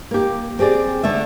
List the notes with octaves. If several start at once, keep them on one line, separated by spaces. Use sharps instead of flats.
A#3 G4
C4 G4 G#4 D5
D3 A3 E5